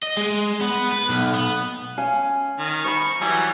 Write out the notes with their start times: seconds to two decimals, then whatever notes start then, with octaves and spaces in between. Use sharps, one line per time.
0.03 D#5
0.17 G#3
0.61 B3
0.92 B4
1.10 B1
1.34 B3
1.97 C#4 F5 G#5
2.59 D#3
2.84 C5 A#5 B5 C#6
3.21 E3 F#3 G3 G#5